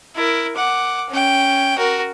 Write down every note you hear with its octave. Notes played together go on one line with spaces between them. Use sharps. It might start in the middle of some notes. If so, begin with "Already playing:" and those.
E4 A#4
F#5 D6
C#4 G5
F#4 A#4